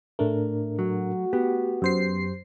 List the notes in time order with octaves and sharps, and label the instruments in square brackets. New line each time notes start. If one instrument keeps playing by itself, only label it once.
[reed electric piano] A2 D4 A#4 [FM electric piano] A3
[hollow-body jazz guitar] F#3 [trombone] F#4
[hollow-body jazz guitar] B3 [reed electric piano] G4
[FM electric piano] F#2 C5 C7